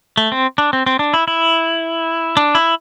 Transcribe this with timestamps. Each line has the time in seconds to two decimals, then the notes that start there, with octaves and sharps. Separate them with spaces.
0.17 A3
0.32 C4
0.58 D4
0.73 C4
0.86 C4
0.99 D4
1.14 E4
1.28 E4
2.37 D4
2.55 E4